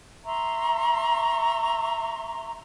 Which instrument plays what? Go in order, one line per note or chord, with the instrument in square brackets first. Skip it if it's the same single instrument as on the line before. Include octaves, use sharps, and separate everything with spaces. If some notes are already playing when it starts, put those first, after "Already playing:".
[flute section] E5 A#5 C6 C#6